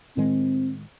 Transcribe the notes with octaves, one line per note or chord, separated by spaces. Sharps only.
A2 D#3 G#3 C4